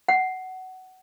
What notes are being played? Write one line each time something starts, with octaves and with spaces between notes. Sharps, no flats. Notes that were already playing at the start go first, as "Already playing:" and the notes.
F#5